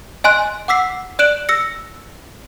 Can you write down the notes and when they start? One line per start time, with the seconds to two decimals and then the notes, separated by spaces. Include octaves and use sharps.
0.24 D#5 G#5 C6 F#6
0.68 F#5 D6 E6 B6 C7
1.19 D5 F#6 D7 E7 F#7
1.49 E6 A#6 C#7